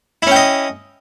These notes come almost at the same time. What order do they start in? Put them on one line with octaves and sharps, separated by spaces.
E4 C#4 G5 D#5